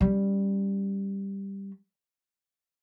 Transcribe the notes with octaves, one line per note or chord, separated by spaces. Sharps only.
G3 C#4